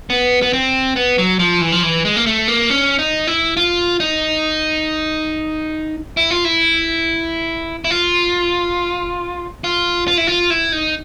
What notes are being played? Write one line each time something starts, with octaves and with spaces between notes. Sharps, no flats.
B3
B3
C4
B3
F#3
F3
E3
F3
E3
G#3
A#3
A3
A#3
C#4
D#4
E4
F4
D#4
E4
F4
E4
E4
F4
F4
F4
E4
F4
E4
D#4